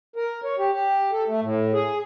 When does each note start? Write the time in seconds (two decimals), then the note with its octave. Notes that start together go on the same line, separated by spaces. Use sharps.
0.16 A#4
0.44 C#5
0.59 G4
0.72 G4
1.12 A4
1.28 A3
1.42 A2
1.73 G#4